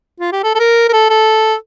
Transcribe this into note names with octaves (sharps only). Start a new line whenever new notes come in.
F4
G4
A4
A4
A#4
A#4
A4
A4